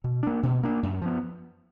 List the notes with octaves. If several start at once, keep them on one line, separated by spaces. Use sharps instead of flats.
B2
A#3 D4
B2
A#3 D4
F#2
F3 B3